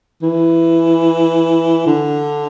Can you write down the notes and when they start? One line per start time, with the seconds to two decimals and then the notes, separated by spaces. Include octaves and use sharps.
0.22 E3
1.86 D3